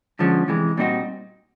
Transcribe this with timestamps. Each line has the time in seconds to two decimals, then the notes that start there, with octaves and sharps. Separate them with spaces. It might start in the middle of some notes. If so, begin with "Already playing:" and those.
0.19 D3 F3 G#3 C#4
0.48 C3 E3 G#3
0.77 A#2 G3 C4 D#4 F#4